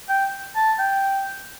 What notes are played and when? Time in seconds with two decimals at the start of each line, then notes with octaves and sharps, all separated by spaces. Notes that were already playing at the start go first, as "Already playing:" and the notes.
0.09 G5
0.56 A5
0.79 G5